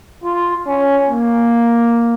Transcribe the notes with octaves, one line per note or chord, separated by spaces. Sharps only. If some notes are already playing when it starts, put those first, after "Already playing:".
F4
C#4
A#3